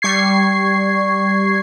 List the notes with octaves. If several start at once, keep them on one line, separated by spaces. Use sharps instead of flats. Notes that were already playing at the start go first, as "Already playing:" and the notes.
G3 C#6 G#6 C7